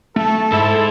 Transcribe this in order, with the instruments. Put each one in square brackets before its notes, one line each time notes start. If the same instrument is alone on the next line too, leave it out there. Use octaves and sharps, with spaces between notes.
[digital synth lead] A3 [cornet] A4
[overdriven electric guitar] G#2 [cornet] E4 [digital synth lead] A4